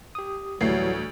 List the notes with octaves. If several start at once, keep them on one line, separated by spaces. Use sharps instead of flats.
G4 D#6
D2 A2 E3 F#3 G3 A3 C7